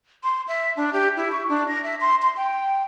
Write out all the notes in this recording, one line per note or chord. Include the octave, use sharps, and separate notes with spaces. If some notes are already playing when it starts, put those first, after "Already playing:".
C6
E5
D4
G4
E4
C#6
D4
A#6
E5
C6
C6
G5